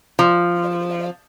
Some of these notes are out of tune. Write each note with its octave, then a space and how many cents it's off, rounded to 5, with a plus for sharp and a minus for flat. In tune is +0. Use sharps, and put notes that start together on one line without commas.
F3 -5